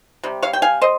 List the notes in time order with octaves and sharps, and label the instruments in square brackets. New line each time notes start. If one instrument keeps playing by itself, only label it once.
[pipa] C3 G3
C#5 F5
G5
F5 G#5
C5 D#5